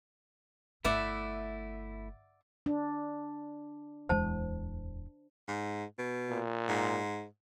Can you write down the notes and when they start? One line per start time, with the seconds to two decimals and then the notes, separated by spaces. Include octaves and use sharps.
0.85 G1 A3 E4 D5 E5 F#5
2.66 D4
4.09 D1 E2 G#3 C5 A5
5.48 G#2
5.98 B2
6.29 A#2
6.69 G#2